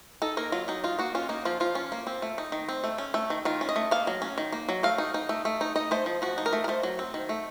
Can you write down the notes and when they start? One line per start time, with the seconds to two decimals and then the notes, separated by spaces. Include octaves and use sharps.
0.22 D#4 A4
0.37 A#3 A#4
0.52 F#3 F4
0.68 F#3 D#4
0.84 D#4 F4
0.99 A#3 F#4
1.15 C#4 F4
1.29 A#3 D#4
1.45 F3 F4
1.60 F3 F4
1.75 C#4
1.92 A#3
2.07 C4
2.22 A3
2.38 D#4
2.52 D#3
2.69 C4
2.84 A3
2.98 C#4
3.14 A3
3.30 D#3
3.45 D#3 F4
3.61 C#4
3.69 D#5
3.76 A3
3.91 A#3 F5
4.07 F#3
4.22 C#4
4.38 D#3
4.52 A#3
4.69 F#3
4.83 A3 F5
4.98 D#4
5.14 D#4
5.29 A3
5.45 A3
5.61 D#4
5.76 D#4 D#5
5.91 A3 C5
6.06 F3
6.22 F3 F#4
6.38 D#4
6.46 A#4
6.53 A3
6.64 A#4
6.68 A3 C5
6.83 F#3
6.99 C4
7.14 D#3
7.29 A3